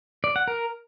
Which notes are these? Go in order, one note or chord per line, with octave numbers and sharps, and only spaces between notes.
D5
F#5
A#4